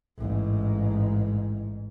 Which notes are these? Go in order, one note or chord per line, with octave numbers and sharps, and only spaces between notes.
A1 G#2